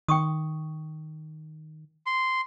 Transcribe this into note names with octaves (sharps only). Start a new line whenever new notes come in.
D#3 G5 C#6 D#6
C6